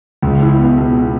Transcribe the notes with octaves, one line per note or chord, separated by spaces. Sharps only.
C#2
E4
B3
B2